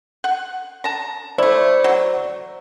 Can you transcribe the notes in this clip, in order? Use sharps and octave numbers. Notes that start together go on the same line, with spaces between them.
F#5
A5 A#5
A3 E4 C5 D5
F#3